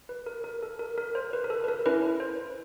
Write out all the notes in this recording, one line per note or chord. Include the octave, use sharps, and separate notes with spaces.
B4
A#4
A#4
A4
A#4
A#4
C5
B4
A#4
A4
B4
A#4
C#4 E4 A4 B4
C5